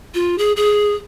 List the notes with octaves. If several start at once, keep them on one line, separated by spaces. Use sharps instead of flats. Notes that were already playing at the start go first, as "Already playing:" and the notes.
F4
G#4
G#4